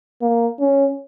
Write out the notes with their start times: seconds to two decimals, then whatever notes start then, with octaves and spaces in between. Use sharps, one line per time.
0.22 A#3
0.60 C#4